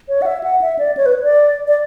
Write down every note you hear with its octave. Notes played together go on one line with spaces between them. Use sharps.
C#5
F#5
E5
F#5
E5
D5
C#5
B4
D5
D5